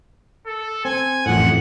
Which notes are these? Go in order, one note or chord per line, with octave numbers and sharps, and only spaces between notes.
A4
C4 G#5
A1 F2 A2 F#5